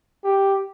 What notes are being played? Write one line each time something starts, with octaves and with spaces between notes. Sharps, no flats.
G4